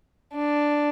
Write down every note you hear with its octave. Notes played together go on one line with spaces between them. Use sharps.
D4